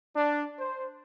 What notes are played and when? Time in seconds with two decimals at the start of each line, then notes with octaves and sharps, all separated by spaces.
0.15 D4
0.58 C5